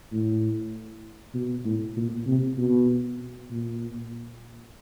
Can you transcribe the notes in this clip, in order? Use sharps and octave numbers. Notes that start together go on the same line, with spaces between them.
A2
B2
A2
A#2
C3
B2
A#2